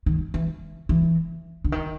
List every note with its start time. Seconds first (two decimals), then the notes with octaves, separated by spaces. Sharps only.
0.06 D#3
0.34 E3
0.89 E3
1.64 D3
1.72 D#3